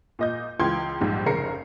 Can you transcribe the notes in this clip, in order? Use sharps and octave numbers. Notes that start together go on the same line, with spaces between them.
A#2 D#5 G6
C#2 E3 F4 G5 C6 G#6
A#1 G#2 G3 G4
F1 C#3 A#4 C7 C#7